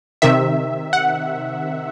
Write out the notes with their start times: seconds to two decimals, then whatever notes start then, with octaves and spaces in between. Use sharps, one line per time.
0.22 C3 D#3 E5
0.93 F#5